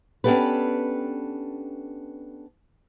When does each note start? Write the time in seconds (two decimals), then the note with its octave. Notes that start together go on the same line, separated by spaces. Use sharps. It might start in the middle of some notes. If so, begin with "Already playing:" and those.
0.24 B3 C#4 D4 G4 A4 B4